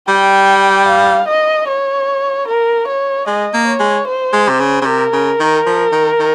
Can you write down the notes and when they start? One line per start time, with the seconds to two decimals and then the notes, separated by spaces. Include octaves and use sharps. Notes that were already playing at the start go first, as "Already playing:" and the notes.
0.08 G3 G5
0.88 F5
1.28 D#5
1.68 C#5
2.48 A#4
2.87 C#5
3.27 G#3 D#5
3.54 A#3
3.67 C#5
3.80 G#3
4.07 C5
4.33 G#3
4.49 C3
4.60 C#3
4.82 C#3
4.86 C3 A#4
5.13 C#3
5.40 D#3
5.66 F3
5.92 D#3
6.20 D#3